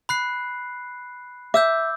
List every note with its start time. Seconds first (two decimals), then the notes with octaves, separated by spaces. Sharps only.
0.09 B5 F#6 C7
1.54 E5 D6 E6 G6